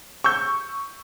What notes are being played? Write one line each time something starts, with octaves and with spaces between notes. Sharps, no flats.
C#6 E6 G6